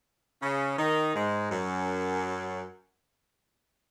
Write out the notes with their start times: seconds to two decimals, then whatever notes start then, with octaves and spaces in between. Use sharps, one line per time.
0.42 C#3 C#4
0.78 D#3 D#4
1.15 G#2 G#3
1.51 F#2 F#3